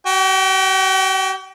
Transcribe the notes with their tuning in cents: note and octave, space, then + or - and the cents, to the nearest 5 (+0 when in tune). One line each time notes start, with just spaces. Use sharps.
F#4 +45 G5 +0